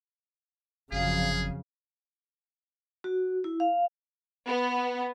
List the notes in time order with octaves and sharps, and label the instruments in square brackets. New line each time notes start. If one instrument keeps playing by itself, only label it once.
[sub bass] G1 [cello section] F2 F#3 F5 [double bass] C#3 [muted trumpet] G#4
[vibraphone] F#4
E4
F5
[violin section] B3